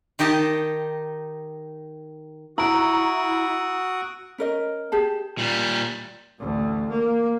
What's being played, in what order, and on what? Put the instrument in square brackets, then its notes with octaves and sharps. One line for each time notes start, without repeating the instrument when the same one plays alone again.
[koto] D#3 D#4 G4 D#5 A5
[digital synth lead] E4 [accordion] F#4 C#6 D#6 [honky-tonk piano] A#5 [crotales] E6 D7
[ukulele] C#4 A#4 D#5
G4 G#4 A5
[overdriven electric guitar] A#2 G3
[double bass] A1 D2
A#3